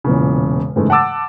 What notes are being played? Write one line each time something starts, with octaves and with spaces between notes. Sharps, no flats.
E1 E2 A#2 C#3
G#2 C#3 E3 G#3 A3
F#5 A5 D6 E6 A6